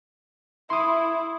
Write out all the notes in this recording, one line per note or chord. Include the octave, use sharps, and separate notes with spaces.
E4 C6 D#6